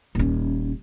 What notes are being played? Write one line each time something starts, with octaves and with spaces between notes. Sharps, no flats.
D#1 C#4